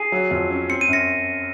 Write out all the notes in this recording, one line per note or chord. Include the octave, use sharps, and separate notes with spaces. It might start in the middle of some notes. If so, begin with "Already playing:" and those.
Already playing: G#4 C7 D#7
F#3
F2
C#4
C4 C#7
D#7
F#2 A#6 C#7